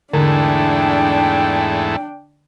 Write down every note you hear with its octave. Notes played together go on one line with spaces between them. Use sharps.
E2 G#2 D3 A3 D4 G5